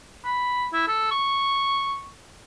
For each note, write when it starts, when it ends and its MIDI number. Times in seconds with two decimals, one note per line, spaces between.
0.24 0.66 83
0.73 0.87 64
0.88 1.08 69
1.11 2.06 85